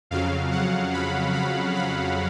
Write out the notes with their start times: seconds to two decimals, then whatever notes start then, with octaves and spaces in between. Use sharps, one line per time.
0.11 F2 C#3 F#3 F5
0.52 F#5
0.93 B5
1.34 B5
1.75 B5